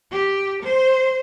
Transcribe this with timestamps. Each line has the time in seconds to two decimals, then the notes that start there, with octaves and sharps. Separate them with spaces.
0.12 G4
0.63 C5